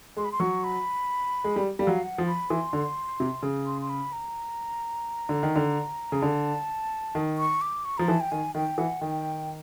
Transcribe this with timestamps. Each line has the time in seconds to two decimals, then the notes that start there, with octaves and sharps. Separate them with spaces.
0.17 G#3 C6
0.25 B5
0.32 C6
0.40 F#3 C#6
0.64 B5
1.44 G#3
1.56 G3
1.79 G3 F5
1.87 F#3
2.03 F#5
2.18 F3
2.27 B5
2.50 E3 C6
2.73 D3
3.20 C3
3.43 C#3
3.66 C6
3.82 C6
3.89 B5
4.12 A#5
5.29 D3
5.43 D#3
5.56 D3
6.12 C#3
6.22 D3 A5
7.15 D#3
7.38 C#6
7.62 D6
7.85 C#6
7.98 F3 A#5
8.08 E3 A5
8.20 G5
8.32 D#3 G#5
8.55 D#3 G5
8.78 E3 F#5
9.01 D#3 G5